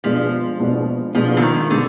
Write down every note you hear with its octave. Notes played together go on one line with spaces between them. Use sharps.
B2 F3 G#3 B3 D4
B2 G#3 B3 D4
B2 F3 G#3 B3 D4
D3
D#3
B2 D3 G#3 B3